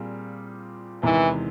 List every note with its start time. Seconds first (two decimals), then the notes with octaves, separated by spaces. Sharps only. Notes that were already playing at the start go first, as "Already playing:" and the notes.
Already playing: A#2 G3 C4 F4 G#4
1.03 E2 C3 D#3 E3 G#3